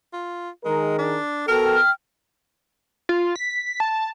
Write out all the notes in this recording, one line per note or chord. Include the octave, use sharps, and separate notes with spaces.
F4
D#3 G#3 G#4 A#4
D4
B3 F#4 A4 A#4 G5 F6
F4
B6
A5